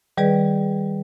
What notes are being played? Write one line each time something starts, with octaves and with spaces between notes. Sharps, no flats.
D#3 G3 G#4 B4 D5